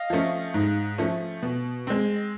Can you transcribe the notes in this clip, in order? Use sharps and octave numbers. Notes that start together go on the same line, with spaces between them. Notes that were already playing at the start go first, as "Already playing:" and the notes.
Already playing: D#5 F5
F3 A3 C#4
G#2
F3 A3 C#4
B2
G#3 C4